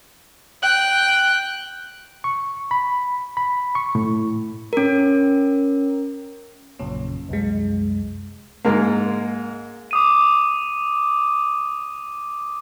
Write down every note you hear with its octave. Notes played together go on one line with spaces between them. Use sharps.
G5 F#6
C#6
B5
B5
C#6
A2
C#4 A#4
A#1 F#2 A#2 C#3 C#4
C2 F#2 G#3
G#2 G#3 A#3
D6 D#6 D#7